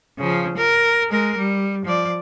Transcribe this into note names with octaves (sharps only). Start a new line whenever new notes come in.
C#3 F3
A#4
G#3 A#4
G3
F3 D5